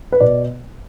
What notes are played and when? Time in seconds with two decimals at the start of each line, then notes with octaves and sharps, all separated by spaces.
0.12 B4
0.20 B2 D5